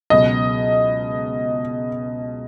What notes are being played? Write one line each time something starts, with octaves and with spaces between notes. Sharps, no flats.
C#2 B2 F#3 D#5